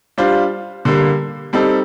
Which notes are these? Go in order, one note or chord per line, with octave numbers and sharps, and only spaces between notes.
G3 D4 F4 C5
D3 G3 A#3
G3 C4 D#4 A4